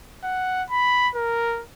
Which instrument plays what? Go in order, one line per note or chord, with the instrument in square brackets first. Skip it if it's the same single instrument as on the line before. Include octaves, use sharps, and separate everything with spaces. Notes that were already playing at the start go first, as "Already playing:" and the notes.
[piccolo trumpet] F#5
B5
A#4